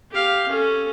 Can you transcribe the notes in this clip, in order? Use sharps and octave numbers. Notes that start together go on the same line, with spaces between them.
G4 F5
C#4 A4